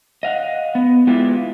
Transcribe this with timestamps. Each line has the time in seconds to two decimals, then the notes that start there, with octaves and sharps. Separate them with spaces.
0.23 D#5 F5 F#5
0.75 B3
1.07 G#3 B3 D4 E4 F4 G4